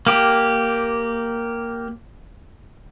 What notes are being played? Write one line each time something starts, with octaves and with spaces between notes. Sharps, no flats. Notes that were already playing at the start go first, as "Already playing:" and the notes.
A#3 G4